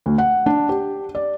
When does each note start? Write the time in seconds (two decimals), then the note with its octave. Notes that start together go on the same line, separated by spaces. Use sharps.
0.06 D2
0.18 F#5
0.46 D4
0.69 G4
1.15 D5